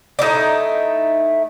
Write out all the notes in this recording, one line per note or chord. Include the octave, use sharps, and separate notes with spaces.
A3 D#4 E4 D5